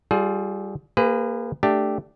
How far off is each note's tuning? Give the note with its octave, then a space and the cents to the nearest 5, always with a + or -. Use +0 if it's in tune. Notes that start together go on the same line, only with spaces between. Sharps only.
G3 +0 F4 +0 G#4 +35
A#3 -5 G#4 -35 B4 +25
A3 +0 D4 +0 G4 +0